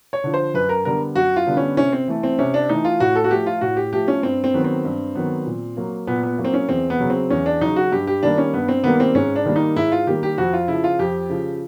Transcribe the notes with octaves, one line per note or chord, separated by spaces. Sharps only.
C#5
D3 F3
C5
F#2 B4
A#4
D3 G3 B3 A#4
F#2 F#4
F4
D3 G3 B3
C#4
C3 C#4
C4
E3 A3
C4
C3 C#4
D4
E3 A3 D#4
F4
A2 F#4
A4
F#4
F3 A3 G4
F4
A2 F#4
G4
F3 A3 G4
C#4
G2 C4
C4
D#3 F#3 B3
C4
G2
D#3 F#3 B3
A#2
F#3 A#3
A#2 B3
B3
F#3 A#3
C4
C#4
E2 C4
B3
C#3 F#3
C4
E2 C#4
D4
C#3 F#3 D#4
F#4
G2 G4
G4
D#3 G3 A#3 D4
C#4
G2 B3
C4
D#3 G3 A#3 B3
C4
G#2 C#4
D4
D#3 G3 A#3
D#4
G#2 E4
F4
D#3 G3 A#3 G4
G4
F2 F#4
F4
C#3 F3 E4
F4
F2 G4
C#3 F3